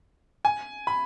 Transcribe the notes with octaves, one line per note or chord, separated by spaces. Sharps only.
G#5
B5